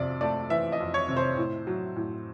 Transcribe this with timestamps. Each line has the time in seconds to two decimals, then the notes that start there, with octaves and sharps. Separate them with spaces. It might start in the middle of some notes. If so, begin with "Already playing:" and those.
Already playing: F2 C3 D5
0.21 A3 D5
0.50 E3 E5
0.72 D#5
0.80 F2
0.94 C#5
1.09 C3
1.17 C5
1.37 A2
1.67 F#3
1.96 A2